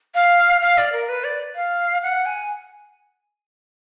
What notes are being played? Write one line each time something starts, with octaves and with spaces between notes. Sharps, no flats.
F5
F5
D5
A#4
B4
D5
F5
F#5
G#5